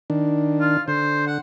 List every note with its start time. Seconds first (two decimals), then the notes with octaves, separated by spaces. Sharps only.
0.10 D#3 D4
0.60 F4
0.88 D3 C5
1.27 F#5